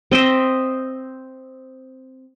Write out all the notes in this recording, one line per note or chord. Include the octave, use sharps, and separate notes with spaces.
C4 D#5 E5 G5